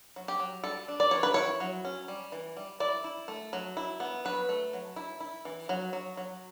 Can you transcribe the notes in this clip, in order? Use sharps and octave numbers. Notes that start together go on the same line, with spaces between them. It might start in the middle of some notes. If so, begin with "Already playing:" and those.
F#3
G4
F#3
G3 A4
D4
D5
E3 C#5
B4
E4 C#5
F#3
C#4
G3
E3
G3
E4 D5
E4
A3
F#3
E4
B3
F#3 B4
A3
F#3
E4
E4
E3
F#3
F#3
F#3